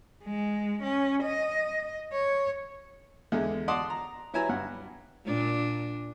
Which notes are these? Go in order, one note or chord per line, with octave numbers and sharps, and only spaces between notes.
G#3
C#4
D#5
C#5
E2 D3 G#3
D5 D#5 F#5 A5 C6 D#6
A#5
F#3 E4 B4 G#5 A#5
G2 F#5
A#2 D4